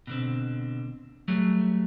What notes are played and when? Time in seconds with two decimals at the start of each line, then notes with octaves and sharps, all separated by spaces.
0.07 B2 D3 C4
1.28 F#3 G3 A3 G#4